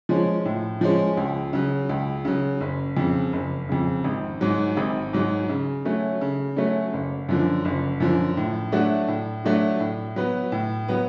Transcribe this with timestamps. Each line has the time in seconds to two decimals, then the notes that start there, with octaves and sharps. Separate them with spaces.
0.09 F3 G#3 C#4
0.45 A2
0.81 F3 G#3 C#4
1.17 C#2
1.53 C#3 F#3
1.89 C#2
2.25 C#3 F#3
2.61 F#1
2.97 F2 C#3
3.33 F#1
3.69 F2 C#3
4.04 G#1
4.41 G#2 F#3
4.77 G#1
5.13 G#2 F#3
5.49 C#3
5.85 F#3 A3 C#4
6.21 C#3
6.57 F#3 A3 C#4
6.93 F#1
7.29 F#2 D3 F3
7.65 F#1
8.00 F#2 D3 F3
8.37 A2
8.72 F#3 A3 D4 F#4
9.08 A2
9.44 F#3 A3 D4 F#4
9.80 A2
10.16 F#3 B3
10.52 A2
10.88 F#3 B3